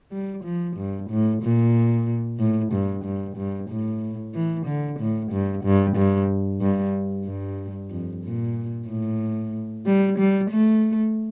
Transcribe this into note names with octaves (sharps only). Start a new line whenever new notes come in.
G3
F3
G2
A2
A#2
A2
G2
G2
G2
A2
E3
D3
A2
G2
G2
G2
G2
G2
F2
A#2
A2
G3
G3
A3